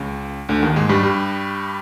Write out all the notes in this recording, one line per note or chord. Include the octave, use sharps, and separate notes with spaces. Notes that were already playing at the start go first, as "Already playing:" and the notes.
Already playing: C#2 C#3
D2 D3
D#2 D#3
G#2 G#3
G2 G3
G2 G3